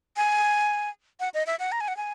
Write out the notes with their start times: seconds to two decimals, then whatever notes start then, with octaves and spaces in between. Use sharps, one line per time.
0.17 G#5
1.20 F#5
1.34 D#5
1.47 E5
1.59 F#5
1.72 A#5
1.80 G#5
1.88 F#5
1.97 G#5